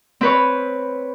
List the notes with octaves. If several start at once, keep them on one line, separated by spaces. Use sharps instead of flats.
C4 B4 C#5